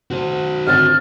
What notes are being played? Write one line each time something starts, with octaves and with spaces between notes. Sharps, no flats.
F#4 C5
G#1 D3 F6 A6